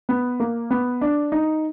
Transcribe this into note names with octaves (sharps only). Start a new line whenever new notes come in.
B3
A#3
B3
D4
D#4